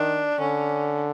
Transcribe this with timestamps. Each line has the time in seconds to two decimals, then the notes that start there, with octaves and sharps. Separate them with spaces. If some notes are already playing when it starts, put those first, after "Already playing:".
Already playing: D#3 D4
0.40 D3 C#4